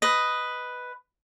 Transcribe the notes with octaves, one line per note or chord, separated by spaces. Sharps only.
B4 D#5